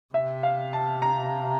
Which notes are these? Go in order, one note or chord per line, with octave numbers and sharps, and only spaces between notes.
C3 E5
F5
A5
A#5